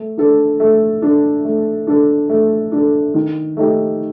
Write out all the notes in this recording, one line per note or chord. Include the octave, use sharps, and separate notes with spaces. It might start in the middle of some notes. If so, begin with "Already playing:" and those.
Already playing: A3
D4 A4
A3
D4 A4
A3
D4 A4
A3
D4 A4
D#3
A3 D#4 G4